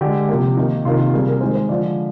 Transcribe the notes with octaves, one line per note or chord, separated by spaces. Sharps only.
D3 G#3 G4
C3 F3 A#3
D#3 A#3 D#4
C3 D#3 A#3 F4
C3 G3 A#3 G#4
A#4
D#3 G#3 C5
C5
D3 F3 G#3 D5